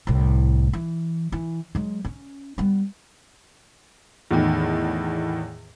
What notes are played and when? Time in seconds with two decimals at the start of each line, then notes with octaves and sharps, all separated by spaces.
0.07 C2 A2
0.73 E3
1.32 E3
1.75 F#3 G#3
2.05 C#4
2.58 G3 B3
4.31 E2 A2 D#3